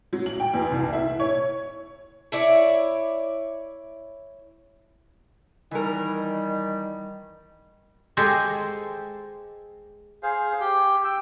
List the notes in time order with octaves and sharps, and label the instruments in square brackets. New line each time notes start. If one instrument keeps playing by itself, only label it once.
[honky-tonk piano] F#3
F#7
G5
E2
C2
E4
C#5
[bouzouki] E4 C#5 D5
[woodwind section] D#3 G3 [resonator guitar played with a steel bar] E3 A#4
[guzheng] G#3 G4 A4 C5 D#5 G#5
[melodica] G#4 C5 F5
G4
G5 E6